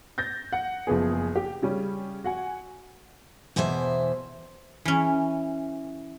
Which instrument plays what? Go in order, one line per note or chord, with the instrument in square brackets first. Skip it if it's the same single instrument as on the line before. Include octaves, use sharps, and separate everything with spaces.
[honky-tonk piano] G6 A6 A#6
F#5
F#1 F3 B3 G#4
G4
C#3 G3 C#4
F#4 F#5 G#5
[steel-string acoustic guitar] E2 B2 E3 C5 E5
[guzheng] E3 C#4